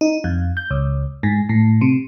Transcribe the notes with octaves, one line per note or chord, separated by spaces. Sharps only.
D#4
F2
G6
C#2
G#2
A2
C3